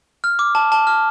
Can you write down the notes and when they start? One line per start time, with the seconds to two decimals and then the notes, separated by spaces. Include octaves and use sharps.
0.24 F6
0.39 D6
0.55 A5
0.72 A5
0.87 F6